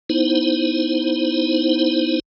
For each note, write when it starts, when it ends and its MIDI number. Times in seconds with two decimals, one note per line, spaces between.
0.10 2.20 59
0.10 2.20 63
0.10 2.20 64
0.10 2.20 72